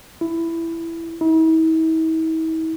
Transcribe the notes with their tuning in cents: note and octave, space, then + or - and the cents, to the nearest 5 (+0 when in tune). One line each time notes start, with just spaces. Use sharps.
E4 +10
E4 -45